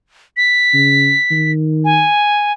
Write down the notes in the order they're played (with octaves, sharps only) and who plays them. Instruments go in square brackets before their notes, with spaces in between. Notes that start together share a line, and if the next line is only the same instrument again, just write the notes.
[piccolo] B6
[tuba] C#3
D#3
[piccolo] G#5